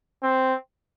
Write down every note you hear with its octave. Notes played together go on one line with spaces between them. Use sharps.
C4